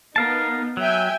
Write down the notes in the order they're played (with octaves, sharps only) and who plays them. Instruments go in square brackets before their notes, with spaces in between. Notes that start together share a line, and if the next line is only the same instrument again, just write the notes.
[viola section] B3 D#4 [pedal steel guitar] A#4 F5 A5
[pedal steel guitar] F#3 [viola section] E5 G5 G#5